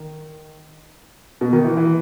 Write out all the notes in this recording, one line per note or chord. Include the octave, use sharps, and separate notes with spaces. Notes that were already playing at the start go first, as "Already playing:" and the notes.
Already playing: D#3
B2
D#3
E3
E3